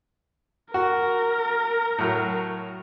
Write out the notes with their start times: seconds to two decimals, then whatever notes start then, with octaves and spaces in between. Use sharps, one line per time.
0.74 F#4 A#4
1.98 A2 F#3